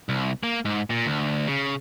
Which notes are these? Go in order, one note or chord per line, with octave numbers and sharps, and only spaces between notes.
C2
A#3
G#2
A#2
D2
C#3